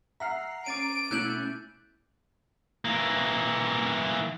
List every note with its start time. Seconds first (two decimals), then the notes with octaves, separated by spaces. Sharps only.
0.20 E5 F#5 A#5 F6 C7
0.66 C#4 D6 A6 D7 D#7
1.11 B2 A3 C#4 E4 F#6 G6 F#7
2.85 E3 A#3